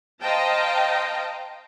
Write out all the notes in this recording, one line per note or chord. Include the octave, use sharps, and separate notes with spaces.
C5 D#5 F5 G5 A5 A#5